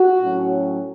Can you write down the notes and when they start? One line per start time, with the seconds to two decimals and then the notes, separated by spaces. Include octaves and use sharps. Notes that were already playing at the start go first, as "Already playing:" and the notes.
Already playing: F#4
0.22 A2 F#3 C#4